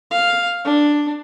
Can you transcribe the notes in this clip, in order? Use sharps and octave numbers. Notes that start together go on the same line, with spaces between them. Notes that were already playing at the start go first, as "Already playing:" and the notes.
F5
D4